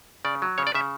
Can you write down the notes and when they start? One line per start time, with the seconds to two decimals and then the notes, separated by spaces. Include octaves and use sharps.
0.25 C#3 D5
0.42 F#3
0.58 C#3 C#5
0.67 D5
0.74 C#3 E5